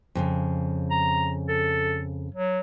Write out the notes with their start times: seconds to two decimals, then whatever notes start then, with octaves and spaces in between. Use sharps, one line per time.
0.15 F2 A2 C#3
0.91 A#5
1.49 A4
2.35 F#3